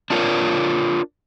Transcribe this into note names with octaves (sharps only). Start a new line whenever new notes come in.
D4 F4 A#4 C#5